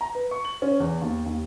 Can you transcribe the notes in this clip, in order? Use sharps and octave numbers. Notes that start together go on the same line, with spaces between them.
A#5
B4
C#6
F#7
C#4
E2
D#2
D#2